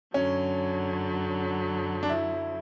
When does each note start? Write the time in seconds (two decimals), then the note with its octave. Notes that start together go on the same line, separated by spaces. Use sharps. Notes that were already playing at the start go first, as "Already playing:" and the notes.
0.14 F#2 D3 F#3 C#4
2.03 D4
2.09 E4